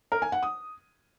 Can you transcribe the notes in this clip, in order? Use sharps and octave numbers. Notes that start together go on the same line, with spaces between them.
A#4
G#5
F#5
D#6